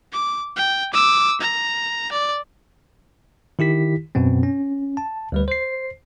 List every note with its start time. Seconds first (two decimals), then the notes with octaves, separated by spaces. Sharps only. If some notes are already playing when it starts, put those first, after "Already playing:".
0.12 D6
0.56 G5
0.94 D6 E6
1.41 A#5
2.12 D5
3.59 D#3 E4 G4 B6
4.15 F#2 B2 B3 C4
4.43 C#4
4.97 A5
5.32 D2 G3 B4
5.48 C5 C7